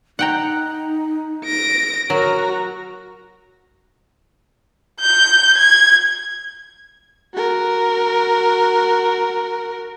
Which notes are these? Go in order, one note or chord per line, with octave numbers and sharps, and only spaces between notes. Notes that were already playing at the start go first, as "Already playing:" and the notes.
D#4 F#5 G5 A#5
A#6 D7
F#3 F#4 A#4 A#5
G6
G#6
F#4 A#4